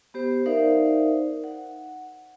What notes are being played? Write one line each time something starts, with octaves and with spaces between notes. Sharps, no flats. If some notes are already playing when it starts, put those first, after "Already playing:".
B3 G4 C5
D#4 A#4 C5 D5 E5 F5
F#5